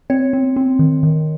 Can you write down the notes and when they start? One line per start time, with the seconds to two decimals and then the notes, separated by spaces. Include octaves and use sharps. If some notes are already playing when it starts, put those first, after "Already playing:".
0.10 C4 C#5
0.33 C4
0.56 C4
0.79 D#3
1.03 D#3